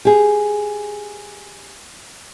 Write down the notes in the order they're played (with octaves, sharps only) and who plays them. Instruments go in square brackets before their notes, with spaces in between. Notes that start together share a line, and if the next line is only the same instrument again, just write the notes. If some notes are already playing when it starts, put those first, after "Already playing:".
[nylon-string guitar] G4 G#4